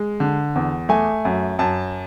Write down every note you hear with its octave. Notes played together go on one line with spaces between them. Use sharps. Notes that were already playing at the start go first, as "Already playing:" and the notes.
Already playing: G#3
D3
E2
A3 G#5
F#2
F#2 A5